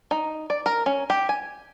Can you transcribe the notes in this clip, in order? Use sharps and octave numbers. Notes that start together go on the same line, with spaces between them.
D#4
D5
A#4
C#4
G4
G#5